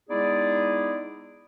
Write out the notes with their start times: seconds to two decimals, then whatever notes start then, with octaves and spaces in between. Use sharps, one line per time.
0.10 G#3 B3 D#4 E4 G#4 D5